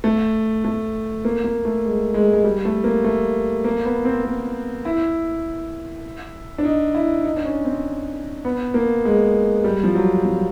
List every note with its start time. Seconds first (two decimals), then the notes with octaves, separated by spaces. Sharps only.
0.04 A3
0.65 A3
1.25 A#3
1.44 A#3
1.65 A3
1.85 G#3
2.14 G#3
2.33 G#3
2.44 G3
2.65 A3
2.84 A#3
3.04 A3
3.64 A#3
3.85 B3
4.05 C4
4.24 A#3
4.85 E4
6.58 D4
6.65 D#4
6.95 E4
7.24 D#4
7.36 D4
7.45 C#4
7.65 C4
8.45 B3
8.74 A#3
9.05 G#3
9.64 G3
9.84 F3
9.95 F#3
10.25 F3